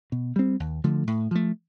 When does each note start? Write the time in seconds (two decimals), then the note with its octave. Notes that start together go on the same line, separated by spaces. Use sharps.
0.12 B2
0.36 G3 C4
0.60 D#2
0.84 D3 F3 A3
1.07 A2
1.31 F3 A3